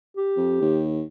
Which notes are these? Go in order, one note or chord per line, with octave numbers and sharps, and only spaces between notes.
G4
F2
D#2